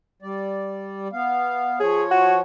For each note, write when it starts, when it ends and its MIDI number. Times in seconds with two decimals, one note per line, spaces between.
0.22 1.08 55
0.22 1.08 74
1.13 1.79 59
1.13 1.79 77
1.80 2.41 53
1.80 2.03 68
1.80 2.41 73
2.11 2.38 66